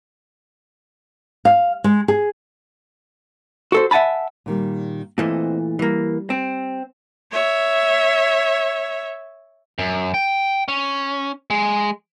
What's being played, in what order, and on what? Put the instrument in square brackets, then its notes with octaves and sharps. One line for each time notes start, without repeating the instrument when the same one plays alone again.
[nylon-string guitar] F5
G#3
G#4
[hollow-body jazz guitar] F#4 A4 C5
E5 F#5 G#5 A5 B5
[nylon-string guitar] A#2 D#3 G3
[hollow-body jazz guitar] A#2 E3 A3 [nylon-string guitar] C4 C5 D#5
[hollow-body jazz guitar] E3 A#3 [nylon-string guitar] G3
[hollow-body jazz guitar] C4
[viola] C#5 E5
[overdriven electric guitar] F#2
G5
C#4
G#3